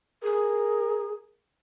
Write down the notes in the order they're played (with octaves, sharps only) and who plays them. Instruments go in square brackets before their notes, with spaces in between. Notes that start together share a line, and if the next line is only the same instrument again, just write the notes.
[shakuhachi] G#4 [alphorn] A#4